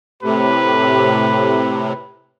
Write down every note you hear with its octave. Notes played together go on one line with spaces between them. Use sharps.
A2 C3 B4